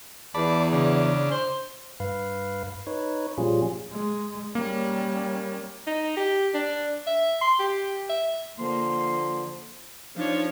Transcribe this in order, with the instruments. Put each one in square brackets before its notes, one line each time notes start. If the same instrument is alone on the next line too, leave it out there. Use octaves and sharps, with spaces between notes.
[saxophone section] E2 [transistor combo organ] D5 A5 B5
[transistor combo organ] C#3 D4
[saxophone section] C5
[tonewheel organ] G2 B4 F5
D#4 B4 C#5
A#2 F3 G3 C#4 F4 G#4
[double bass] G#3
[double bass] G3 C#4 [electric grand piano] A#3
[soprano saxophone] D#4
G4
D4
E5
C6
G4
E5
[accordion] D3 F3 [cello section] A#3 [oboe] C6
[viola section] F3 [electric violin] D4 C#5 [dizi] D#4